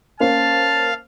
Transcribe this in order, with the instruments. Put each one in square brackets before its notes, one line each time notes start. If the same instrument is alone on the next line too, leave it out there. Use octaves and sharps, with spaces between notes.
[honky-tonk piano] A#3 C#4 C5 [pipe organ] F5 [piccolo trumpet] A5